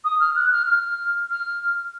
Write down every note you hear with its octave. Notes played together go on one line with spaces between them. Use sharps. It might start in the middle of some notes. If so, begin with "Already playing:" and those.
D#6
F6
F#6
F6
F6
F6